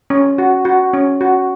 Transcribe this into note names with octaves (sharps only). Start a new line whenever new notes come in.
C#4
F#4
F#4
C#4
F#4